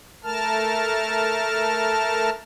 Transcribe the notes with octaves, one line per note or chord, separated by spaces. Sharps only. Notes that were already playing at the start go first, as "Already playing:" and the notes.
A3 A#4 A5 F6